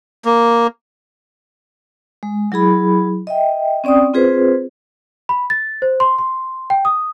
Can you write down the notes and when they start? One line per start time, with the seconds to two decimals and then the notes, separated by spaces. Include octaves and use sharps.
0.25 A#3
2.23 G#3
2.52 F#3 E4 G#4 B5
3.27 D#5 E5 G5
3.84 C4 C#4 D5 G5 D#6
4.13 C4 F4 G#4 B4 C5
5.29 B5
5.50 A6
5.82 C5
6.00 C6
6.18 C6
6.70 G5
6.85 D#6